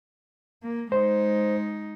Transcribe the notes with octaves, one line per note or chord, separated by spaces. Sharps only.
A#3
G#3 D#4 C5